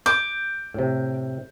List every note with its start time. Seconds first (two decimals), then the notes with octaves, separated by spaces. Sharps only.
0.06 D6 G6
0.74 A2 C3